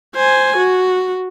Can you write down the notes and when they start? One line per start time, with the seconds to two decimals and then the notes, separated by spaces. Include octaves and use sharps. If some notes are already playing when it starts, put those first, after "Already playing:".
0.16 C5 G#5
0.58 F#4